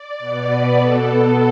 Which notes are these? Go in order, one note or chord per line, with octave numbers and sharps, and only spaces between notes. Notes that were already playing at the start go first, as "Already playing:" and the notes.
Already playing: D5
B2 B3
B4
B2 B3 A4
A4